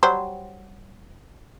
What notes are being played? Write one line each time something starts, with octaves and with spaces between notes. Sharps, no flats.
F#3 G3 C5